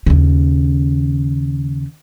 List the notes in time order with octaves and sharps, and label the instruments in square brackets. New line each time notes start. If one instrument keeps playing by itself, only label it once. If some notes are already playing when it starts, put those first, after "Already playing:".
[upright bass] D#2 C#3